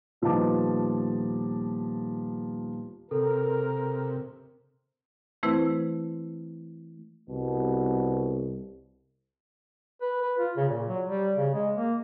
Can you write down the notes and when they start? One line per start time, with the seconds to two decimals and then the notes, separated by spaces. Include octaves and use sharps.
0.22 D#1 F3 B3 D#4 A5 D6
3.11 C3 A4 A#4
5.43 E3 A3 C4 E4 B4 C5
7.29 C2 B2
10.01 B4
10.21 B4
10.39 F4
10.57 C#3
10.69 A#2
10.87 F#3
11.06 G3
11.36 C#3
11.54 G#3
11.75 A#3